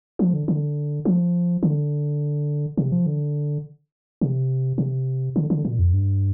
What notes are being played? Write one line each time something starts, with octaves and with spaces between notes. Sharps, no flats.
F3
D3
D3
F3
D3
C3
F3
D3
C3
C3
D3
D3
A#2
F2
G2